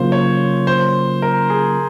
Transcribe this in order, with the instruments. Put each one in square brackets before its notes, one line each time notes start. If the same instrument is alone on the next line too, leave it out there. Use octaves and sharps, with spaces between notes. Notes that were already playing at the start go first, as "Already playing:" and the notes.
Already playing: [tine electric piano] C#3 F#3 A#3 F4 [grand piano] C5
[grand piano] C#5
C5
A#4
G#4